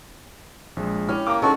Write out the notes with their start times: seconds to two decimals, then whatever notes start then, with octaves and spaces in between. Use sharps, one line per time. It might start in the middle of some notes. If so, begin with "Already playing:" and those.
0.77 A#1 G#3
1.09 C#4 E4 G4 C#5 F6
1.27 A#3 A#5 D6
1.42 D#3 G#3 C#4 F#4 A4